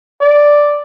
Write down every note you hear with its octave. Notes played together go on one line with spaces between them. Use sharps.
D5